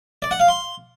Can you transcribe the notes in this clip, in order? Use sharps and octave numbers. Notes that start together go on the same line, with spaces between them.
D5
F#5
F5
C6